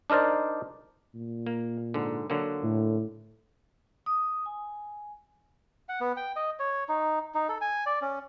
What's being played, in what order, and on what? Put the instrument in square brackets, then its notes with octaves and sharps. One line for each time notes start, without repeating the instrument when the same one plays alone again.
[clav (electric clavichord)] D4 D#4 A#4 C5 D5
[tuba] A#2
[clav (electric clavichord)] A#3
G#2 D3
D3 F#3 A#3
[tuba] A2
[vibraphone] D#6
G#5
[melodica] F#5
B3
G5
D#5
C#5
D#4
D#4
A4
G#5
D5
C#4